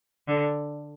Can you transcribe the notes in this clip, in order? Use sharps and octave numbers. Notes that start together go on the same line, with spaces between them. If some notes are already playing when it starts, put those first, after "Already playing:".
D3